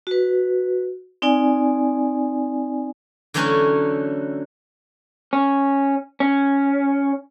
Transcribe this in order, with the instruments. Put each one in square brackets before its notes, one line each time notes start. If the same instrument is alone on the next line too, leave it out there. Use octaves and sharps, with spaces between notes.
[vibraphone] F#4 B4
C4 D#4 D5 G#5
[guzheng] D3 E3 F#3 A3 C#4 E4
[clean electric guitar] C#4
C#4